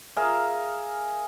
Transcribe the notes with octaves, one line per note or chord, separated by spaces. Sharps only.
G#4 A#4 E5 F5